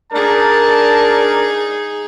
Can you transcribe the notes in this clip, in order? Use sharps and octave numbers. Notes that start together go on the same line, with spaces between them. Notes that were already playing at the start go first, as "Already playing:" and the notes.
D4 D#4 G#4 A#4 A5